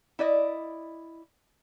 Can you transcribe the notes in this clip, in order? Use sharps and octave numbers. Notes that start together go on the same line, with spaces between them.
E4 D5 D#5